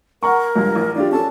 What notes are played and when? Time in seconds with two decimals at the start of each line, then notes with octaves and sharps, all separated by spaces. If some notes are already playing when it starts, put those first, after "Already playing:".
0.23 A#4 F#5 A#5 C#6
0.55 C#2 G2
0.75 A1
0.95 D4 F4 G4 D5
1.12 C#4 A4 A5